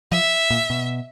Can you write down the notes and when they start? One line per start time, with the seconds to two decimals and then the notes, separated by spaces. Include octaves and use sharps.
0.12 F3 E5
0.50 A#2
0.70 B2